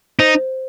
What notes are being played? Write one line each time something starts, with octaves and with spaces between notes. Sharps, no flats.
D#4 C5